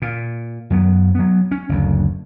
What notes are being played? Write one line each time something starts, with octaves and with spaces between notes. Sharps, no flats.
A#2
F#2 F#3 B3
F#3 B3
C#4
F#1 D2